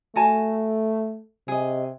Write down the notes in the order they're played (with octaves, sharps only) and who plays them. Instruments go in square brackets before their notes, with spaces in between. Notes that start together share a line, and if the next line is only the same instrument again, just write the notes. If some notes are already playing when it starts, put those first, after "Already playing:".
[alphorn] A3 [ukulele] F#4 G#5 A5
[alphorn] C3 [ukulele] G#4 D#5